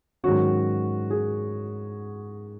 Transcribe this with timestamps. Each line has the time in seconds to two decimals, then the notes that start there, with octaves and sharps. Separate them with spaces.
0.23 G#2 D#3 F#3 C#4 F#4
1.10 G#4